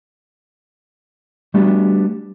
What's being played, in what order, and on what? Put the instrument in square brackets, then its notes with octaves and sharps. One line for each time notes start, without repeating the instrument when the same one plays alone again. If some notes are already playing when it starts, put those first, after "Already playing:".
[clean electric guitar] G3 A3 B3 D4 F#4 G4